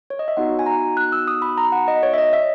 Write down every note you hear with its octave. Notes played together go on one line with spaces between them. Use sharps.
C#5
D#5
E5
B3 D#4 F#4 F#5
G#5
A#5
F#6
E6
D#6
B5
A#5
F#5
D#5
C#5
E5
D#5
E5